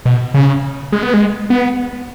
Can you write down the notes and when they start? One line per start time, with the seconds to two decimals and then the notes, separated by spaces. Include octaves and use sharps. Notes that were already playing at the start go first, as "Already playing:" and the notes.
0.05 B2
0.34 C#3
0.92 G#3
1.03 B3
1.14 G#3
1.50 B3